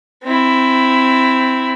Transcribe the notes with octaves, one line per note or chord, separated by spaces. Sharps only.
C4 E4